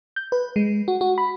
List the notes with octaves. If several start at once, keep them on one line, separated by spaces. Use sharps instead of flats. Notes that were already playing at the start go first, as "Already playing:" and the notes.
G6
B4
G#3
F#4
F#4
B5